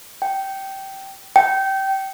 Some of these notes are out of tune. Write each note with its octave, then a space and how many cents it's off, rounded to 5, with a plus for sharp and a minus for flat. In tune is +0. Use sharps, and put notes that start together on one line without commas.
G5 -15
G5 -20